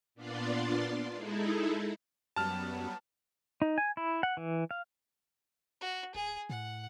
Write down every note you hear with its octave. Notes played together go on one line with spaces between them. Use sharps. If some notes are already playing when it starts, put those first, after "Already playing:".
A#2 B3 D4 F4 D5 C6
G#3 D#4 E4 G#4 A4
F#2 F#3 G3 B3 A5 F6
D#4
G#5
E4
F#5
E3
F5
F#4
D1 G#4
A2 F#5